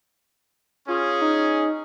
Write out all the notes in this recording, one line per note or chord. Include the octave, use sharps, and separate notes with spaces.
C#4 F4 G#4
D#4